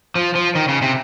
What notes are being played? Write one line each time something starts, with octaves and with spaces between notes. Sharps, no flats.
F3
F3
D#3
C#3
C3